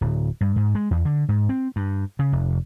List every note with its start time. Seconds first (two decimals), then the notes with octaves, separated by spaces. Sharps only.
0.01 D1
0.41 G2
0.56 G#2
0.75 G#3
0.91 E2
1.05 D3
1.29 G#2
1.49 C4
1.76 G2
2.19 C#3
2.32 F1